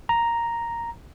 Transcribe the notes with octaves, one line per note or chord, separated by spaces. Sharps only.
A#5